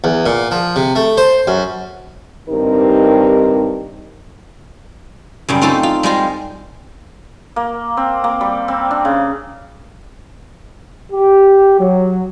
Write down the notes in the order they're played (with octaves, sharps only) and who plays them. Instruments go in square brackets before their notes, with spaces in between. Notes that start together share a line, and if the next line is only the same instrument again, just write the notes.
[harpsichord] E2
A#2
F3
C3
A3
C5
F#2
[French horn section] G2 D#3 C4 D#4 G4 A#4
[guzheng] F#2 C#3 G3
C4 D#4 F4 A4 C5 A5
F4
G3 G#3 F4 C5
[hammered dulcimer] A#3
C4
A#3
G3
C4
D4
C#3
[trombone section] G4
F#3